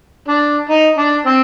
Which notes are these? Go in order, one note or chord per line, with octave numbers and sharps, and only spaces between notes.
D4
D#4
D4
C4